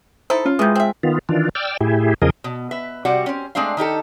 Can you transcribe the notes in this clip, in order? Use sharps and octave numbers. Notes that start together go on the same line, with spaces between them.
D#4 E4 A4 C5
C#4 F4
C3 E3 G#3 D#6 G6
C4 E5
D#3 B3 F4
D#3 E3 D4 F4
D5 G5 E6 F6
A2 E4 G4 G#4
E2 C#3 F3 G#4 A#4 D#5
B2
B4 E5
C3 G3 F#4 D5 F#5
C4 C#4
G#3 A3 C4 D4 F5
D#3 D#4 G4 A4